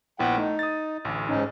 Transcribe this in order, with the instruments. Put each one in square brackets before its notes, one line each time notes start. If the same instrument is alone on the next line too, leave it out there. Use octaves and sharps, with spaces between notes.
[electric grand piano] A#1 B3 E4 [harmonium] F#5 G5
[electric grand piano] A3 [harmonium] D#4
[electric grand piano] D#6 A6
A1 D2
[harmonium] G#2 C#4 D#4